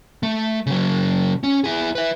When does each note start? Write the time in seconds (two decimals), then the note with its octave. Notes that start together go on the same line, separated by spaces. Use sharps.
0.23 A3
0.67 C#3 F#3
1.43 C#4
1.64 E4 G#4
1.95 B4 E5